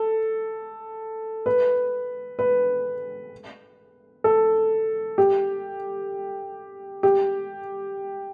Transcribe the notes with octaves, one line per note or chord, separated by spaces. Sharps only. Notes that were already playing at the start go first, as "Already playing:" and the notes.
Already playing: A4
B4
B4
A4
G4
G4